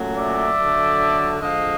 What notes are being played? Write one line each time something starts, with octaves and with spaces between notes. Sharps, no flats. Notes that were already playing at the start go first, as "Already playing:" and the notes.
Already playing: A#2 F#3 A3 C#4
D5 E5
D3 F#3 A3
D3 F3 G#3 D#5 F5